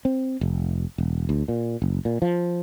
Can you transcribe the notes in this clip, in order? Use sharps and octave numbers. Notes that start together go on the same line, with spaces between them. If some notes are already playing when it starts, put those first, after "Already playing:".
C4
F1
E1
D2
A#2
F#1
A#2
F3